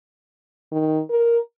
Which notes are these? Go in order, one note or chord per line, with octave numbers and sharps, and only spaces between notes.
D#3
A#4